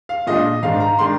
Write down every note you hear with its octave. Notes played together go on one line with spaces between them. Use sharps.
F5
A#2 G#3 D4 D#5
G#2 D#3 G#3 D4 F5
A#5
D#3 G#3 D4 C6